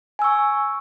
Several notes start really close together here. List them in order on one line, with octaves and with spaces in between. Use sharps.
G#5 E6 C#6